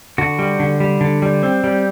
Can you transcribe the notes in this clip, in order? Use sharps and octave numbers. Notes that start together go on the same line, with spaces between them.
D3 F#4
G3
D3
G3
D3
G3
C4
G3